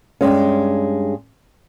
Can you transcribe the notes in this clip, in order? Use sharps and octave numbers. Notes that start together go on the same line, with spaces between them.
G2 G#3 C#4